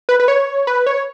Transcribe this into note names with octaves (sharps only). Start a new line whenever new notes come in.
B4
B4
C#5
B4
C#5